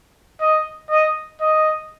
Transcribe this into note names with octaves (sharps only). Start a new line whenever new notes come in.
D#5
D#5
D#5